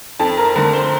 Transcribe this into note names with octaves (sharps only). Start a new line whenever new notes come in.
F2 A4 A5
A#4 A#5
D3 A3 A#4 A#5
C5 C6